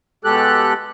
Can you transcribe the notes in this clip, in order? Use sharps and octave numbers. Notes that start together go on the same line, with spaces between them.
B2 G#3 G4 A4 F#6